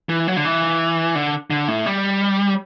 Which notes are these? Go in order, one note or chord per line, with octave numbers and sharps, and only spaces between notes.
E3
F#3
D3
E3
D3
D3
A2
G3